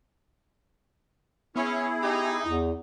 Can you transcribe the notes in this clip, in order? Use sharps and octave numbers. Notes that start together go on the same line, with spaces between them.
B3 C#4 E4 G#4
D#4 G4
E2 E4